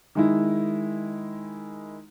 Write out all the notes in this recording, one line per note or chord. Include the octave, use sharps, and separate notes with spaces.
D#3 G#3 E4